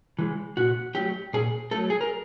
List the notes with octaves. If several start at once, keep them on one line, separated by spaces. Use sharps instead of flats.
E3 G#3
A#2 F#4
F#3 A3 G4
A#2 G#4
F#3 A3 A4
G#4
A#4